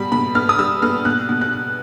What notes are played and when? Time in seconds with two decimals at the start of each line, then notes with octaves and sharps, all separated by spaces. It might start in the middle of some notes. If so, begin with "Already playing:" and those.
Already playing: B2 G3 B5
0.12 B2 B5
0.35 B3 F6
0.49 D#6
0.59 G3 E6
0.82 B3 F6
1.05 B2 F#6
1.29 B2
1.41 F#6
1.53 B2